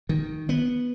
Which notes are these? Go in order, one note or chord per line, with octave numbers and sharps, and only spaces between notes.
D#3
B3